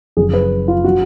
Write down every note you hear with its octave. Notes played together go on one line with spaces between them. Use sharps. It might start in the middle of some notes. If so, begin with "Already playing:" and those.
F#1 F#2 F3 G#4
B4
F4
D3 F#3 F#4